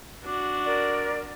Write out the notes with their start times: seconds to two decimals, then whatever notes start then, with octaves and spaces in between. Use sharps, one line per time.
0.25 D4 F#4
0.65 A#4 D5